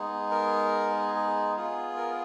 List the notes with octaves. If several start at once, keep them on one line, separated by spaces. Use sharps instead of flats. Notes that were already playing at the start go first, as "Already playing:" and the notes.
Already playing: G#3 B3 D#4 G#4
A#4
G#4
B3 F4 G#4
A#4